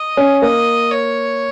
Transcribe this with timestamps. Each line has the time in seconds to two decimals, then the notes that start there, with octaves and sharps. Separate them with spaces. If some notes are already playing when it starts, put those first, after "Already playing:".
Already playing: D#5
0.17 C#4
0.42 A#3 D#5
0.91 C#5